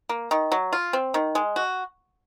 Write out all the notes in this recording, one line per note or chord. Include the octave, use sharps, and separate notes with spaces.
A#3
D#3
F#3
F4
C4
D#3
G#3
F#4